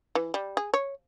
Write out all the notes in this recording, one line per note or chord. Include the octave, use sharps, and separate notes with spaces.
E3
G3
G#4
C#5